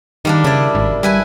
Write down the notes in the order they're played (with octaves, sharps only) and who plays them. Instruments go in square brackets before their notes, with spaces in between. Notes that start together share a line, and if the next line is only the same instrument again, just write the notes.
[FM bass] D#3 [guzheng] G3 A#3 D4
[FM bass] C#3 [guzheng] E4 D5
[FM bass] G#1
[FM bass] G3 [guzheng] E4 B4 G#5